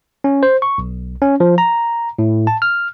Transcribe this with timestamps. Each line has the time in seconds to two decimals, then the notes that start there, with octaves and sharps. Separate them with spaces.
0.24 C#4
0.43 C5
0.62 C#6
0.78 B1
1.22 C#4
1.40 F3
1.58 A#5
2.19 A2
2.47 A5
2.62 F6